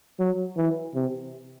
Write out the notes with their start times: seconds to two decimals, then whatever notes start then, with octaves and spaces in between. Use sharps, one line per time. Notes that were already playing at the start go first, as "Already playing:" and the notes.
0.19 F#3
0.57 E3
0.95 C3